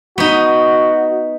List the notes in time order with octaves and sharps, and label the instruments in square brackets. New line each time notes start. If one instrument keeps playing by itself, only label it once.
[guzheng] B3 D#4 [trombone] F#4